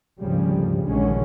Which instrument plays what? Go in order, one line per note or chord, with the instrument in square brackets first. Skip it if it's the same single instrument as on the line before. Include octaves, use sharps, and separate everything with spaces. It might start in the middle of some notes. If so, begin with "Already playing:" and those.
[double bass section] G#1 D2 C#3 F3 G3
A#1 A#2 D3 D#3 G#3 C#4